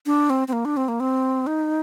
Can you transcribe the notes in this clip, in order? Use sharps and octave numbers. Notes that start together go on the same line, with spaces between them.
D4
C4
C4
A#3
D4
C4
A#3
C4
D#4